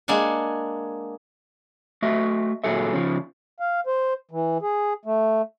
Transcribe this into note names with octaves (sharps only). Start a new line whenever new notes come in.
G#3 A#3 D4 F#5 G#5
A3 F#4 D#5 E5
A#2 D#3 F#3 G#4 A4 E5
C#3 F3
F5
C5
E3
G#4
A3